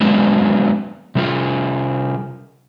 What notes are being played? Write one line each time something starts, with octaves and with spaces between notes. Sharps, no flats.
F#3 G#3 B3 C4 D4
C3 G3 F4 G#4